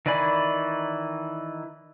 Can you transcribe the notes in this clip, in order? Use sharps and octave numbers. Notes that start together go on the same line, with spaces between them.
D#3 E3 D5 G#5 B5